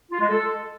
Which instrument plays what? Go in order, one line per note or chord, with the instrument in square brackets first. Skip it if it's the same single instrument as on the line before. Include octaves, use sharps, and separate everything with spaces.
[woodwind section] F4
G#3
A4